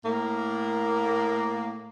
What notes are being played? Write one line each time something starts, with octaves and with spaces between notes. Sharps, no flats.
A2 A#3